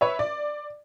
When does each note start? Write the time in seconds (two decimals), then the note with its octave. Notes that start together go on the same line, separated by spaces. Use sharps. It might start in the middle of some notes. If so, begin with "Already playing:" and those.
0.01 B4 C#5 E5
0.19 D5